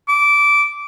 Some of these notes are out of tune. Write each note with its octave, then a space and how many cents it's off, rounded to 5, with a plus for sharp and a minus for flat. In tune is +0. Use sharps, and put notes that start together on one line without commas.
D6 -15